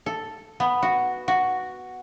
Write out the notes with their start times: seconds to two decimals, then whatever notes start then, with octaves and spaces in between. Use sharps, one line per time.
0.06 A4
0.60 B3
0.82 F#4
1.28 F#4